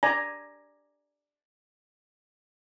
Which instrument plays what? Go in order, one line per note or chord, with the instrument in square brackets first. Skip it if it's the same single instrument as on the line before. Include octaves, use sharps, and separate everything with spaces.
[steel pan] D5 G#5 A#5